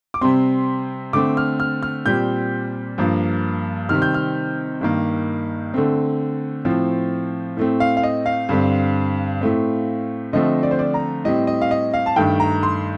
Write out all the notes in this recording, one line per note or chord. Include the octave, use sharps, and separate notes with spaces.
D6
C3 G3 C4 C6
D3 A3 C4 D6
F6
F6
F6
A#2 G3 C4 G6
G2 F3 A#3
C3 D#3 G3 C4 F6
G6
F6
G2 D#3 A#3
D3 A3 C4
A2 F3 C4
A2 A3 C4
F5
F5
D#5
F5
G2 D3 G3 C4
A2 A3 C4
D3 F3 A3 C4 D#5
D5
C5
D5
A#5
A2 G3 C4 D#5
D#5
F5
D#5
F5
A5
G2 D#3 A3 G5
A#5
C6